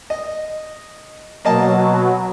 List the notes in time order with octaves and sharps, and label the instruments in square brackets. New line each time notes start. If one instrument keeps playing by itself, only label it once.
[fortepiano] D#5
[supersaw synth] B2 F#3 [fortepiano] A#3 D#5 A5